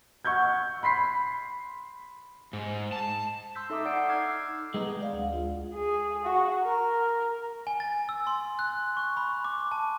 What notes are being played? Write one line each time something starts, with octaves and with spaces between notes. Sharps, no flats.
F#5 C#6 E6 G6 G#6
B5 C6 B6 C7
G#2
A5
C6 E6 G6 B6
D#4 A4 E5 C6 D6 D#6
D5 F#5 G6 C7 D7
D#4 D6 E6 F6 G#6 C7
G#3 B3 D#4
G#3
D5 F5
D2
F4
G#4
F#4
A#4
G#5
A6
E6
C6
F#6
C#6
B5
D6
A5